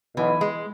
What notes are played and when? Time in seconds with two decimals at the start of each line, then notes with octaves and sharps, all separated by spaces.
0.16 B1 B2 E3
0.41 G#3